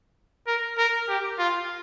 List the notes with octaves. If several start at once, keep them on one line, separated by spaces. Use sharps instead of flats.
A#4
A#4
G4
F4